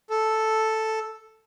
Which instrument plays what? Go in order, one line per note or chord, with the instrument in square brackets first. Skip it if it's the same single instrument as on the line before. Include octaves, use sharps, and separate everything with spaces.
[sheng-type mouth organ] A4